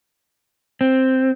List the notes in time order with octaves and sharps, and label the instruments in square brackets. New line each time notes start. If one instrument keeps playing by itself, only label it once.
[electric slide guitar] C4